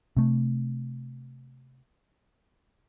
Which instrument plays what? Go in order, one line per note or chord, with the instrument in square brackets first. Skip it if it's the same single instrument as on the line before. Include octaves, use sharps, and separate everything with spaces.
[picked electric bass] C3 A3